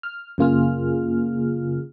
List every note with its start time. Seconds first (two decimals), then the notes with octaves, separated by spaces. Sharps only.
0.03 F6
0.38 F#2 C#3 A#3 F4 G#4 F6